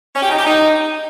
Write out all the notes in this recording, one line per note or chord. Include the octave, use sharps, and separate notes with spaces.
C#4
G4
D#4
G4
D#4